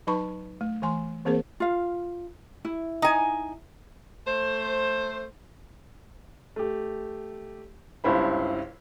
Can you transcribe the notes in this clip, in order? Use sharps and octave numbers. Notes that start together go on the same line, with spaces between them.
F#3 D#4 B4 A5 B5 C#6
A3
E3 A3 G#5 C6
E3 A#3 C4 G#4 A#4 C5
F4 F5
E4
D#4 G#5
A3 C5
A3 G4
G1 C#2 G2 E4 C5 B5